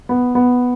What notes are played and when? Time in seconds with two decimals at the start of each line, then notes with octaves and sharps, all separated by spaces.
0.09 B3
0.35 B3